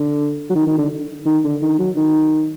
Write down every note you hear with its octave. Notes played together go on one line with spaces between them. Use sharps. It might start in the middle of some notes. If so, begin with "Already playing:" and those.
Already playing: D3
F#3
D#3
D#3
D3
D#3
D3
D#3
F#3
D#3